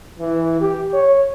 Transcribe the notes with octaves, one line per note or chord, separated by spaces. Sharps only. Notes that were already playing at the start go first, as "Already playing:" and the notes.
E3
G4
C#5